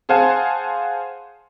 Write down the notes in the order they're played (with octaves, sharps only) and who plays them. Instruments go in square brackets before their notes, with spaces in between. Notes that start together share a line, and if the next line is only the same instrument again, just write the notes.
[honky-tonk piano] G#4 C5 F5 F#5 G#5 A5